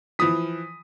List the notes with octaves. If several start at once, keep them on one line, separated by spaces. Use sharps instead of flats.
E3 F3 D#6 B6